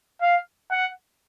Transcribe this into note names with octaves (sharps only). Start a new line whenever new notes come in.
F5
F#5